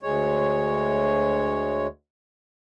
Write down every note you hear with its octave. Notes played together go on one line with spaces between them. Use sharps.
D2 G#3 C#5